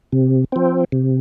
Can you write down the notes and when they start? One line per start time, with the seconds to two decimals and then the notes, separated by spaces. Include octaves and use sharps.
0.12 C3
0.52 F3 C4
0.92 C3